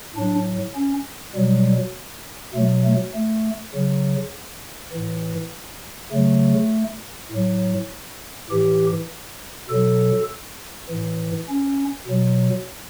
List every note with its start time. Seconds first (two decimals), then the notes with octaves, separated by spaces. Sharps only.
0.16 A2 F#3 D4
0.75 C#4
1.35 B2 F#3 G3
2.54 B2 F#3 A3
2.85 A3
3.15 A3
3.75 C#3 F#3
4.93 A2 E3
6.12 C#3 F#3 A3
7.32 A2 F#3
8.50 A2 E3 G4
9.70 B2 F#3 A4
10.90 A2 E3
11.49 C#4
12.08 B2 F#3